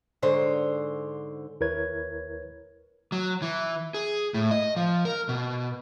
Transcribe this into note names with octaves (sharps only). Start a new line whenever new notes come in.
G#2 D3 C5 C#5
D#2 E4 A#4 B4 C#5 G#6
F#3
E3
G#4
A2
D#5
F3
A#4
B2